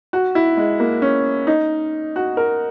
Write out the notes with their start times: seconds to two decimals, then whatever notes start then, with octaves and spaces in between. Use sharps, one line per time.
0.13 F#4
0.35 E4
0.57 G#3
0.80 A#3
1.02 C#4
1.47 D#4
2.16 F#4
2.37 A#4